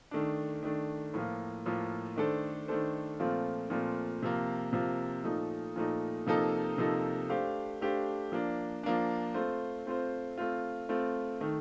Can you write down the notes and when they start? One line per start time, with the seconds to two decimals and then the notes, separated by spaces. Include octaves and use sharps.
0.11 D#3 A3 D4
0.63 D#3 A3 D4
1.14 A2 F3 A#3 F4
1.66 A2 F3 A#3 F4
2.16 D#3 A3 D4 A4 C5
2.68 D#3 A3 D4 A4 C5
3.19 A#2 F3 A3 C4 F4
3.70 A#2 F3 A3 C4 F4
4.22 C3 F3 A#3
4.73 C3 F3 A#3
5.24 A#2 F3 A3 D#4
5.76 A#2 F3 A3 D#4
6.26 C3 F3 A#3 D#4 A4
6.78 C3 F3 A#3 D#4 A4
7.29 A3 D4 G4 C5 F5
7.81 A3 D4 G4 C5 F5
8.32 F3 A#3 D4
8.83 F3 A#3 D4
9.34 A3 C4 F4 C5
9.87 A3 C4 F4 C5
10.38 A3 C4 F4
10.89 A3 C4 F4
11.41 D#3 A3